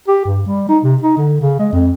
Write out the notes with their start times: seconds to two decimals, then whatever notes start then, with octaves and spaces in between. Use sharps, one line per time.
0.08 G4
0.25 G2
0.47 G3
0.69 D#4
0.83 C3
1.02 D#4
1.17 D3
1.41 C#3
1.59 G#3
1.72 F2